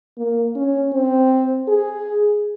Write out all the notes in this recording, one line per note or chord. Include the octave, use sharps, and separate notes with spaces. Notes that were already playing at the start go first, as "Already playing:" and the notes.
A#3
C#4
C4
G#4